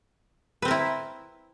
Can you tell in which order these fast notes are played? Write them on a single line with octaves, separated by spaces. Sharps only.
B4 C4 A#4 E4